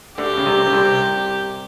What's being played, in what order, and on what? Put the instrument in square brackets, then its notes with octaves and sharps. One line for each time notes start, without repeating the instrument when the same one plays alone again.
[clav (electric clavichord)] D2 D3 [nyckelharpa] G4
[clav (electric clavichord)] C#3
C2 C3
C#3
C2 C3